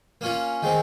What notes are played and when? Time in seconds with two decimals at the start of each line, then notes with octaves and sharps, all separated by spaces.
0.21 A#3 C#4 F4
0.63 D#3 G#3 C4